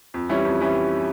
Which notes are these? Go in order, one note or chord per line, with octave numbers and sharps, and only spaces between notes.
F2
E3 G3 C#4 E4
F2
E3 G3 C#4 E4